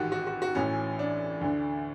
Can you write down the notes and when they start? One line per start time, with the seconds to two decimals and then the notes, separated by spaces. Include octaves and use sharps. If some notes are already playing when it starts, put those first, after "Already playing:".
Already playing: A1 G#2 D#3 F#4 G4
0.12 F#4
0.27 F#4
0.42 F#4
0.55 A1 A2 E3 C#4
0.99 D4
1.41 D2 D3